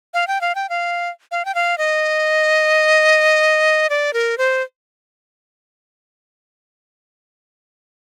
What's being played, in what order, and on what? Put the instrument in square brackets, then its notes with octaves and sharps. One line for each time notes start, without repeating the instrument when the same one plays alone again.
[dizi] F5
G5
F5
G5
F5
F5
G5
F5
D#5
D5
A#4
C5